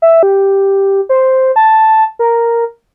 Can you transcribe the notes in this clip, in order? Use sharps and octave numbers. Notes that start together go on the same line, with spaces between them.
E5
G4
C5
A5
A#4